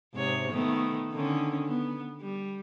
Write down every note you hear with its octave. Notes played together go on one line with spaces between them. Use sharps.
G#2 C3 C#5
D#3 A3 B3
D3 D#3 C#4
B3
G3